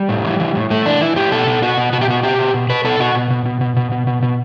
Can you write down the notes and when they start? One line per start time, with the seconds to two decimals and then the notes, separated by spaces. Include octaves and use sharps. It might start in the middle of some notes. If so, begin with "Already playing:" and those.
Already playing: G3
0.09 A2
0.24 E3
0.40 E3
0.55 A2
0.70 A2 A3
0.85 E3 D4
1.01 E3 E4
1.16 A2 G4
1.31 B2 A4
1.47 B2
1.62 B2 F#4
1.78 B2
1.93 B2 F#4
2.01 G4
2.08 B2 F#4
2.23 B2 G4
2.39 B2
2.54 B2
2.70 B2 B4
2.84 B2 A4
3.00 B2 F#4
3.15 B2
3.30 B2
3.46 B2
3.61 B2
3.77 B2
3.92 B2
4.07 B2
4.23 B2